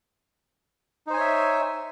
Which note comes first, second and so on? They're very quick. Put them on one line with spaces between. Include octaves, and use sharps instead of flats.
D#4 C5 G#5 C#5 E5